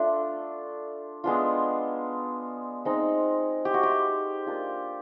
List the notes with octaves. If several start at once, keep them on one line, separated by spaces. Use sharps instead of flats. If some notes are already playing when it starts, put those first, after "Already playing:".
Already playing: A3 D4 F4
G#3 B3 D4 F4
G#3 C4 D#4
G4
F#4
G4
A#3 D4 F4